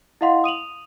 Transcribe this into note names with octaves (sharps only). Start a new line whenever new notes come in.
E4 D#5 F5 F#5 C6
D#6 D#7 F7 F#7